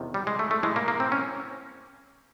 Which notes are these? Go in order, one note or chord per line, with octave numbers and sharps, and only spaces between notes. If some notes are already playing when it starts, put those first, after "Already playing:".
Already playing: E2 C3 D#3
G3
G#3
A3
A3
A2 E3 G#3
A#3
A#3
C4
C#4